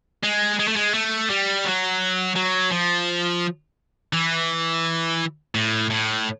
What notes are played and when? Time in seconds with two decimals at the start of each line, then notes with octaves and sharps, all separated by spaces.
0.23 G#3
0.59 G#3
0.68 A3
0.76 G#3
0.94 A3
1.30 G3
1.65 F#3
2.36 F#3
2.72 F3
4.13 E3
5.55 A2
5.90 A2